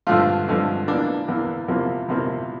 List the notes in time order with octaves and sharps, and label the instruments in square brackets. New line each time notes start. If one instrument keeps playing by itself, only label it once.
[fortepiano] G2 D3 F3 A3 F4
G2 D3 F3 A3
E2 E3 A#3 D4
E2 E3 A#3
E2 C3 F3 A#3
E2 C3 F3 A#3